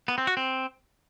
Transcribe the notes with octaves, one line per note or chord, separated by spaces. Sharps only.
B3
C4
F#4
C4